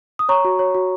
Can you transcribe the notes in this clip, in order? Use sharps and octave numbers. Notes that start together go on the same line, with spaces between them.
D#6
C#5 A#5 C#6
F#4
C#5
F#4